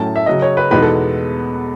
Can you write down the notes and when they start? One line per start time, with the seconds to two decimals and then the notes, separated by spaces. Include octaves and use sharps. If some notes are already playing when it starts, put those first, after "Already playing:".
Already playing: A2 F#3 A3 C#4 A5
0.16 E5
0.26 C#3 F#3 C#4 D#5
0.42 C#5
0.57 B4
0.71 E2 B2 G#3 B3 D#4 B4
0.82 A4